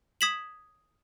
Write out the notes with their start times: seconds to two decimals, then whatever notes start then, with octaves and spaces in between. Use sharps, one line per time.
0.21 D#6 G#6 B6 E7 F#7